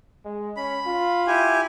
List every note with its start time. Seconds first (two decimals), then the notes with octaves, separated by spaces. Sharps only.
0.25 G#3
0.57 C#4 B5
0.86 F4
1.27 E4 G4 G#5